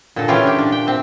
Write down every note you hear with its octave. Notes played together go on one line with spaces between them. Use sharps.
A#2 D3 A4
E3 C#4 F4 G4 E5
D4 G4
A#2 D4
G5
C4 E5